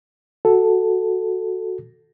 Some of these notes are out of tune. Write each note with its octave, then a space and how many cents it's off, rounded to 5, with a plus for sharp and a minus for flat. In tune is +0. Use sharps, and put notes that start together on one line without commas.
F#4 +0 A4 +0